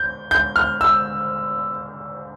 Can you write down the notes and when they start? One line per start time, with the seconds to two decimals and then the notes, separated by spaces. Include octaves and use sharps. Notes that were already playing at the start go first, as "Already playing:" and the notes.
Already playing: G6
0.31 G6
0.56 F6
0.81 E6